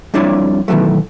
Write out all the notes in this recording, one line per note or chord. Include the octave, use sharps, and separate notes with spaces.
F2 G3 D4 E4 C#5 D5
B2 D#3 E3 F#3 A3